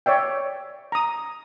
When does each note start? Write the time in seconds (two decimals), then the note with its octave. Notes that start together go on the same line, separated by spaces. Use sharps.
0.06 C#5 D5 E5 G5
0.92 A#5 D#6